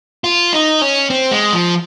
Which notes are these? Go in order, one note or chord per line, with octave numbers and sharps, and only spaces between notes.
F4
D#4
C#4
C4
G#3
F3